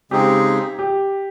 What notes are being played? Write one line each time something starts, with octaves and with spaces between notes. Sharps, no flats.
C#3 G#3 C4 D#4 G4 G#4
G4